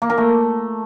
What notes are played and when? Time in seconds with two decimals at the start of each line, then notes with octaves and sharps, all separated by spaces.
0.02 A#3
0.10 A#4
0.18 A3